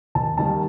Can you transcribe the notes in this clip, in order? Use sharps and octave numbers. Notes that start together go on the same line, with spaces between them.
D#2 A5
D#3 G3 A#3 A5